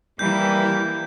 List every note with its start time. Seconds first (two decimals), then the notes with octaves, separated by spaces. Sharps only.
0.19 E3 G3 A#3 G6